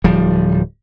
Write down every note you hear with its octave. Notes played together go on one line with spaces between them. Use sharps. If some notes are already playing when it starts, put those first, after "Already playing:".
D1 F3 G3